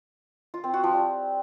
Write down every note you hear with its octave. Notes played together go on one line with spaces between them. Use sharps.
F4
C4
F#4
F3
G3